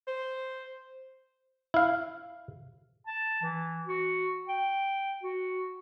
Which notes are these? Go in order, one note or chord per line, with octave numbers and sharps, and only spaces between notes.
C5
E4 F5
A5
E3
F#4
G5
F#4